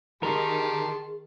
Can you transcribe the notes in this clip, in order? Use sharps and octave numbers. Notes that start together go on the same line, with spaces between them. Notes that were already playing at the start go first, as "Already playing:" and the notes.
D#3 G4 G#4 A#4 A5 C6